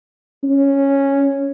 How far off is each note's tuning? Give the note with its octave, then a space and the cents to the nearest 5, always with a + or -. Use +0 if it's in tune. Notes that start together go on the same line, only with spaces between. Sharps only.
C#4 -5